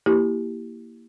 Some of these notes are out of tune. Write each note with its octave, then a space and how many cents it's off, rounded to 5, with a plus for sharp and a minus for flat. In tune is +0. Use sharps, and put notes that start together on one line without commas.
A#3 +0 E4 -10 G4 -5